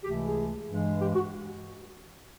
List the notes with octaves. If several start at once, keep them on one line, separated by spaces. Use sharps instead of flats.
C#2 C3 E3 A3 G4
G#4
G2 E3 G#3
G4
F#4